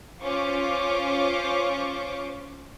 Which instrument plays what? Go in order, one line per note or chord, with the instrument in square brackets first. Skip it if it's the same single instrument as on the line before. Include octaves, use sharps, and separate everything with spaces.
[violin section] C#4 F4 C5 C#6 D6